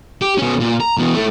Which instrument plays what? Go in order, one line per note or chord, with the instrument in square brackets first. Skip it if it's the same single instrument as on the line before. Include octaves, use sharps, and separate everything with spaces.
[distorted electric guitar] G4
B2 C#4
A#2
A#5
E2 B2
A3 E4